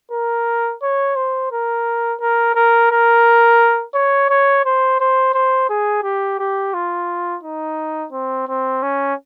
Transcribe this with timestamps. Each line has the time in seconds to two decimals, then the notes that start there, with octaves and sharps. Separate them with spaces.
0.12 A#4
0.82 C#5
1.16 C5
1.52 A#4
2.20 A#4
2.55 A#4
2.91 A#4
3.94 C#5
4.29 C#5
4.65 C5
5.00 C5
5.34 C5
5.69 G#4
6.03 G4
6.39 G4
6.74 F4
7.43 D#4
8.12 C4
8.48 C4
8.83 C#4